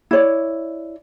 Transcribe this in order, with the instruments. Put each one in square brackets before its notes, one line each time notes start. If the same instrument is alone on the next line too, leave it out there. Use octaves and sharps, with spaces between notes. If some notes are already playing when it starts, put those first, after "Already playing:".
[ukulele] E4 C#5 D5